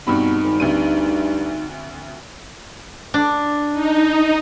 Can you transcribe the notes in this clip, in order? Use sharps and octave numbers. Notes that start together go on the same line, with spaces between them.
G2 B2 C4 D#4 B5
G#1
D2 G2 C4 D#7
D4
D#4